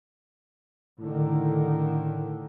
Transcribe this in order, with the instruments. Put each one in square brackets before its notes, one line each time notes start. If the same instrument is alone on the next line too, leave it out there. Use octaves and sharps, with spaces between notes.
[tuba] A2 [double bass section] D3 D#3